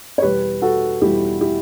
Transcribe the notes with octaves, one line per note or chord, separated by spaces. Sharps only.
C#5
E2 B2 G3 G4 B4
F#4 A4
E2 B2 G3 E4 G4
E4 G4